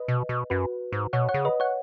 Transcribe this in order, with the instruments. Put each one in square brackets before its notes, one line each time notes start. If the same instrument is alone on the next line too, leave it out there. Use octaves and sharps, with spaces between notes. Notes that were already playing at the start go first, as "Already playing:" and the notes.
Already playing: [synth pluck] B4 D#5
[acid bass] B2
B2
[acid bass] F#2 [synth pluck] F#4 B4
[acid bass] G#2
[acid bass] B2 [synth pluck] C#5 F#5
[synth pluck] C#5 F#5
[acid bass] C#3
[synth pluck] B4 D#5
C#5 F#5